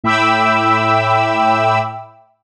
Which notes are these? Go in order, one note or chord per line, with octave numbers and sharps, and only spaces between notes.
A2 E5 G5 B5 D6 E6